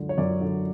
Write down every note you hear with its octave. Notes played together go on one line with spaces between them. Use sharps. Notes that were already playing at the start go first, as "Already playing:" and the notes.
Already playing: C#2 F#2 D3
C#5
F#2 D5
D3